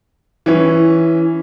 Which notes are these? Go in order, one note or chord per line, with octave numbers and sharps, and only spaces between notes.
E3 C#4